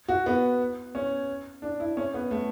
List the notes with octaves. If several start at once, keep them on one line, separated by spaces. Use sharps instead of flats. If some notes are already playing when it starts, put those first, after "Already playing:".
F#4
B3
C#4
D4
E4
C#4
B3
A3